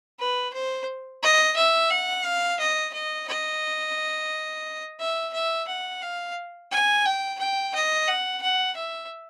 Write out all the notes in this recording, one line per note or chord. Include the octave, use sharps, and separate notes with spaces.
B4
C5
D#5
E5
F#5
F5
D#5
D#5
D#5
E5
E5
F#5
F5
G#5
G5
G5
D#5
F#5
F#5
E5